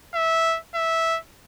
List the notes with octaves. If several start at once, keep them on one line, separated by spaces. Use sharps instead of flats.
E5
E5